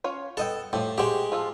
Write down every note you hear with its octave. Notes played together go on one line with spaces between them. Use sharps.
C#4 F4 C#5
B3 A4 D#5 G5
A2 F3 G4
G#3 F#4 G4 C5 G5
F3 F4 A4